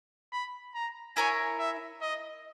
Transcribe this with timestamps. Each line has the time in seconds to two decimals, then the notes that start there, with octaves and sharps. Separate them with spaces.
0.32 B5
0.74 A#5
1.17 E4 A#4 C#5 G#5
1.58 E5
2.01 D#5